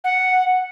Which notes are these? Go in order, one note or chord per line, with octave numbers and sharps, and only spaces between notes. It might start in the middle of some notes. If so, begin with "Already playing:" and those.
F#5